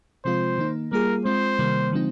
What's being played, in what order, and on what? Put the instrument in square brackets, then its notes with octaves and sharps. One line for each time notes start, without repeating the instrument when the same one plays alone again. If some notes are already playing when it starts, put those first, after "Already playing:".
[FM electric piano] C3 F3 G#3 C4 F4 [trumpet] C5
[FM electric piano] D#3 A#3 D#4
[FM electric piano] G3 A#3 F4 G#4 [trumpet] A#4
[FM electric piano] G#3 C4 F4 [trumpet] C5
[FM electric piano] C3 D#3 G3 A#3
D3 F3 G#3 C4 D#4